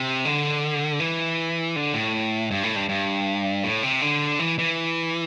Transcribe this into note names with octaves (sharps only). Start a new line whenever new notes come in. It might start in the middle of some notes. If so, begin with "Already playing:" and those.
Already playing: C3
D3
E3
D3
A2
G2
A2
G2
G2
A2
C3
D3
E3
E3